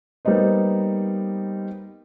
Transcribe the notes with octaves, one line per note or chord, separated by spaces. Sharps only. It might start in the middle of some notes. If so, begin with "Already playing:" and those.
G3 A#3 B3 D#4 C5